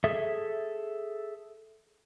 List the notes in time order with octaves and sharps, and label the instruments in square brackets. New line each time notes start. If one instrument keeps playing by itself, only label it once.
[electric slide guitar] G#4 A4 E5